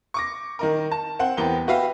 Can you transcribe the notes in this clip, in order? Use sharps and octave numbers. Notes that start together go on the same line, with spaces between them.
C#6 D6 A#6
D#3 D#4 A#4
A5
C4 F#5
E2 B3 C4 G4 A#4 G7
F#4 G4 B4 E5 F5